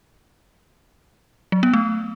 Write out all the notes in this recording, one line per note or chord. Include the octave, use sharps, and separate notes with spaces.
F#3
B3
A3